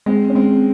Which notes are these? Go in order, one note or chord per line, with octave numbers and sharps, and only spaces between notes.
G#3 C4
C#4
G#3 C4